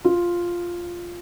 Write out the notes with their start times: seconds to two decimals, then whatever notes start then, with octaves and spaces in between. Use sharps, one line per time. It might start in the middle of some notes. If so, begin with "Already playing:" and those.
0.04 F4